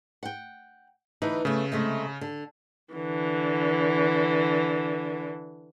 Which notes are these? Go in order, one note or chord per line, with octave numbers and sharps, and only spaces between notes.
F#5 G5
D2 E3 D#4 B4
C#3 A3 B3
C3 G#3 A3
D3
D3 E3